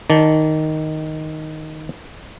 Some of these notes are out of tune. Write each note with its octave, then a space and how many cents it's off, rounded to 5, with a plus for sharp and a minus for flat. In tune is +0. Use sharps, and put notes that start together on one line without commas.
D#3 +0 D5 -30 A5 +0